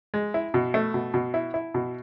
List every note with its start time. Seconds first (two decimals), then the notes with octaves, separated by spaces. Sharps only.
0.14 G#3
0.34 E4
0.54 B2
0.74 A3
0.94 B2
1.14 B2
1.34 E4
1.54 E4
1.74 B2